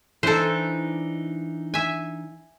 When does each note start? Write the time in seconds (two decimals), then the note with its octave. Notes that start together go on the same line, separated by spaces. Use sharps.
0.23 E3 D4 D#4 A4 C5
1.74 E5 G#5